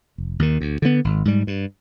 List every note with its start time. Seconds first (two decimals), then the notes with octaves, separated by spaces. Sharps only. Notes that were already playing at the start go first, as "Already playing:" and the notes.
0.18 F1
0.39 D#2 D#3
0.61 D2
0.82 D3 G#3 B3
1.04 G#1
1.25 G#2 G3
1.47 G2